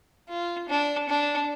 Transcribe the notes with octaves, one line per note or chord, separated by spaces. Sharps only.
F4
D4
D4